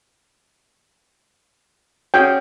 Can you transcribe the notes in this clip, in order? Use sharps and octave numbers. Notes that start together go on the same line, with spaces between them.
C#4 F#4 G#4 G5